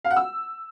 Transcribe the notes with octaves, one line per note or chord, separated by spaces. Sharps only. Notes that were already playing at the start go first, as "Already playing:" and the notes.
F5
F#5
E6